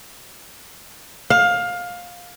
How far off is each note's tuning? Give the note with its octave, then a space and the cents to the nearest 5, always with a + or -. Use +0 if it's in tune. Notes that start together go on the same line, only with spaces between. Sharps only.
F5 +20